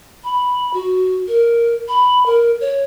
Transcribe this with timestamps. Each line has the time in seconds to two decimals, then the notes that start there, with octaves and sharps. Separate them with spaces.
0.24 B5
0.74 F#4
1.28 A#4
1.88 B5
2.26 A#4
2.61 C#5